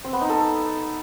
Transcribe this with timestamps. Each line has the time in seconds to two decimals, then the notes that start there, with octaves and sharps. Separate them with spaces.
0.04 C4
0.13 B3
0.21 D#4
0.30 A4